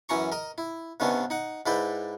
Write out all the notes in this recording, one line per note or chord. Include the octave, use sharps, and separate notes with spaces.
F#2 E3 C#4 A#5 C#6
A#4 D#5
E4
G2 C3 D#3 B3 C#4 D4
D#4 F#5
G#2 E4 B4 D5 G5